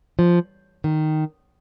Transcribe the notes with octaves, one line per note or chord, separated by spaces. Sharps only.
F3
D#3